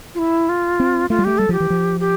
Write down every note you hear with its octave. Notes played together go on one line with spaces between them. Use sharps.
F4
E4
F4
C4
A3 F4
G3
A3 G4
G3 A4
F3 G4
E3
F3
G4